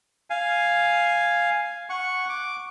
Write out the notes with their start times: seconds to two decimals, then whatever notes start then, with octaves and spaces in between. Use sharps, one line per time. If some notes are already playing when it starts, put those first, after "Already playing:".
0.30 F5 G#5
1.90 F#5 C#6
2.29 D6